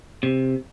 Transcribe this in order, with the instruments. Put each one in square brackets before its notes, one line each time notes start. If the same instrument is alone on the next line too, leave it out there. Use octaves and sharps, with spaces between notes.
[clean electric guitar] C3